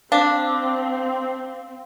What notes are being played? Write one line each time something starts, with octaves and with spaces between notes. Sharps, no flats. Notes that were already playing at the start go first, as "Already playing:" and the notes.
C4 D4 F5